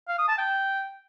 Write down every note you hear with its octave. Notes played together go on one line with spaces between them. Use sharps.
F5
D#6
A5
G5